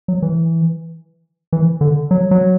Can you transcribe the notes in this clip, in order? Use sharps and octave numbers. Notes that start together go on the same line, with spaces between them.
F#3
E3
E3
D3
F#3
F#3